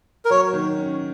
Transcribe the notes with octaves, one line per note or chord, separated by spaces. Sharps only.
A#4
F#3 C#5
D#3
C#4